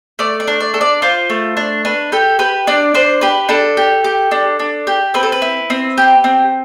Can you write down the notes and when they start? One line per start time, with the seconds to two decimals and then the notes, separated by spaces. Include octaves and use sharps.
0.19 A3 D5
0.40 D5
0.48 D4
0.60 D5
0.74 A4
0.81 D5
1.02 F4 C5
1.30 A3
1.57 D4
1.85 D4 B4
2.12 G4 A4
2.39 G4 B4
2.67 D4 D5
2.94 D4 C5
3.21 G4 B4
3.49 D4 A4
3.77 G4
4.04 G4
4.31 D4
4.59 D4
4.87 G4
5.14 C4 B4
5.23 A4
5.32 B4
5.42 E4
5.70 C4
5.98 G4
6.24 C4